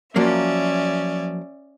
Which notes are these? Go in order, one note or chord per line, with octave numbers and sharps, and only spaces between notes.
F3 F#3 A#3 C#4 D5 E5